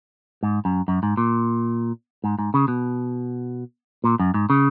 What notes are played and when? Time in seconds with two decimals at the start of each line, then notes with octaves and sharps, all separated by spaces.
0.43 G#2
0.65 F#2
0.88 F#2
1.03 G#2
1.17 A#2
2.24 G#2
2.39 G#2
2.54 C#3
2.68 B2
4.04 A#2
4.20 F#2
4.34 G#2
4.50 C#3